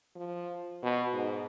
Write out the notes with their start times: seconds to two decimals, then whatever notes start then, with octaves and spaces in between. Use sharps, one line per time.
0.16 F3
0.83 B2
1.13 G#2